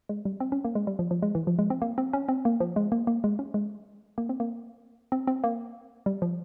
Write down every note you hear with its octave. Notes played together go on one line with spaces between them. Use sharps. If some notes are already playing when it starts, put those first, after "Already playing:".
G#3
G3
C4
C#4
A#3
G#3
G3
F3
F3
G#3
E3
F3
G#3
C4
A#3
C4
C#4
C4
A#3
F3
G#3
A#3
A#3
G#3
C#4
G#3
A#3
C4
A#3
C4
C4
A#3
G3
F3